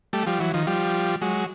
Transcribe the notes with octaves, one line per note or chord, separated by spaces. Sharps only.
G3 A3
F3 G3
E3 F#3
D#3 F3
F3 G3
F#3 G#3